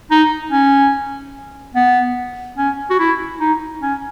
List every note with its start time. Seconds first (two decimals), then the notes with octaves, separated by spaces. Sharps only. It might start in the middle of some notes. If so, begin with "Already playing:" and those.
0.11 D#4
0.52 C#4
1.76 B3
2.58 C#4
2.90 F#4
3.00 E4
3.40 D#4
3.82 C#4